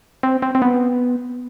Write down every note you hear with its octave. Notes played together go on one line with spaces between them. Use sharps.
C4
C4
C4
B3